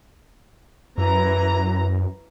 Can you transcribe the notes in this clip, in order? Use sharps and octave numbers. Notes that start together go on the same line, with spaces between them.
F#2 E3 A#5